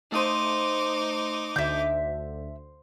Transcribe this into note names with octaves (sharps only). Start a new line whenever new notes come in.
A3 D#4 C5 F5 D6 D#6 D#7
D2 D3 E5 G6